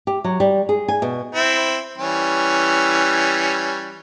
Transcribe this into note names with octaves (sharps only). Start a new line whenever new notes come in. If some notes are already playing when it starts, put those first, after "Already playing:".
G4
F#3
G3
G#4
G#5
B2
C4 E4
E3 G3 C#4